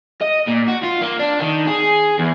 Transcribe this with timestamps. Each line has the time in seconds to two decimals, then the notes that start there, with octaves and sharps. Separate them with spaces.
0.22 D#5
0.48 A#2
0.68 F#4
0.83 F4
1.01 A#3
1.19 D4
1.40 D#3
1.68 G#4
2.19 E2